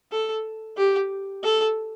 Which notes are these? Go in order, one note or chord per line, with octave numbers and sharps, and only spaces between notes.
A4
G4
A4